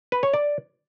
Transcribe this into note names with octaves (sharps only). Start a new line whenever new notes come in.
B4
C#5
D5